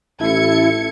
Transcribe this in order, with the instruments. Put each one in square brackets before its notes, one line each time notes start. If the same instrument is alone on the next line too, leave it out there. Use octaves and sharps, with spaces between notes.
[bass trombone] A1 [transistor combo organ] E4 [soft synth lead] A4 [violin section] G#6 C#7